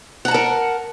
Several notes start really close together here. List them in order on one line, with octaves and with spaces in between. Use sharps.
F#5 A#5 A5 A#4